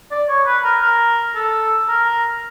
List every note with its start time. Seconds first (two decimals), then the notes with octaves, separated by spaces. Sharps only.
0.11 D5
0.29 C#5
0.46 B4
0.64 A#4
0.82 A#4
1.35 A4
1.88 A#4